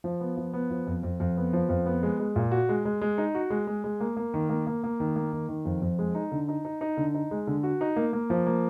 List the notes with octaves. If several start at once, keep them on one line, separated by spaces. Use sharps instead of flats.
F3
B3
F3
B3
F3
F2
F2
F2
B3
F3
F2
B3
G#3
G#3
A#2
F#4
G#3
G#3
G#3
D#4
F#4
G#3
G#3
G#3
A#3
A#3
D#3
A#3
A#3
A#3
D#3
A#3
D#3
D#3
F2
F2
G#3
D#4
D3
D#4
D#4
D#4
D3
D#4
G#3
D3
F#4
D#4
A#3
A#3
F3
A#3